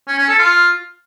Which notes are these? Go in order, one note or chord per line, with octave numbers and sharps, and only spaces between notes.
C#4
C#4
A4
F4